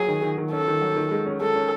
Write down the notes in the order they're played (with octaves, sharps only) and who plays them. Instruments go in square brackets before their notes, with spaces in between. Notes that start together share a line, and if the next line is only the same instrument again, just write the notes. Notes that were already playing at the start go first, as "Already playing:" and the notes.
Already playing: [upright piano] F#3 [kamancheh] G#4
[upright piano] D#3
D#3
D#3
[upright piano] C#4 [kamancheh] A4
[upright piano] D#3
F#3
D#3
G#3
C#4
[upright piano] G#3 [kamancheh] A4
[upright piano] C#4